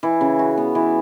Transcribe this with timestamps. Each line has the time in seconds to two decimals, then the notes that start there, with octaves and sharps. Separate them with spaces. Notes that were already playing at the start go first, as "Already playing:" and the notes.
0.03 E3
0.21 C#3
0.39 F#4
0.58 B3
0.75 E3